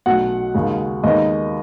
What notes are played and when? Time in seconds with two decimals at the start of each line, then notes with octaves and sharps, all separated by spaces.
0.06 B1 B2 A3 F#5
0.54 D#2 C#3 G#3
1.03 D#2 D#3 G#3 B3 D#5